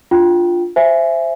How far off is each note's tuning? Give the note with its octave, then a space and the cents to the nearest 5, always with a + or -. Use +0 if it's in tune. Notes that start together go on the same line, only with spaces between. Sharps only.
D4 +0 F4 +0 G5 -15
C5 +0 E5 +15 G#5 +0